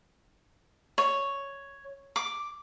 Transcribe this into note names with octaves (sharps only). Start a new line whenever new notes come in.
C#5
D6